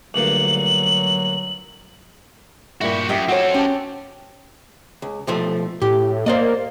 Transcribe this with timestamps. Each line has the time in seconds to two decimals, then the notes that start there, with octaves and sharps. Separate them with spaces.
0.14 D2 G2 A#2 F#3 F#7
2.81 G2 A#2 E4 F#4 G4
3.09 F#2 G4 D#5 E5
3.28 C4 F#4 A4 C#5
3.54 C#4 G4 A5
5.02 C#2
5.27 B1 F3 A3
5.82 A2 G4
6.26 A#3 C5 D5 D#5